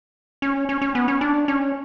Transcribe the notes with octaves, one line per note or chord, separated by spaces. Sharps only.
C#4
C#4
C#4
B3
C#4
D4
C#4